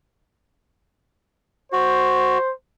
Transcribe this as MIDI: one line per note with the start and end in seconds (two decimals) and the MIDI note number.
1.72 2.38 66
1.72 2.52 72